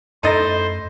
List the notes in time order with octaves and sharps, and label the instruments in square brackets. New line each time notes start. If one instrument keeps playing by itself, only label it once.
[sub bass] F#2 [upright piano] A3 A6 A#6 [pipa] D#4 E4 D#5 [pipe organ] C5